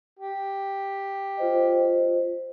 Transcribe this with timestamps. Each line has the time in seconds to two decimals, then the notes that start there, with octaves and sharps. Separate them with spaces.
0.20 G4
1.37 F4 C5 D#5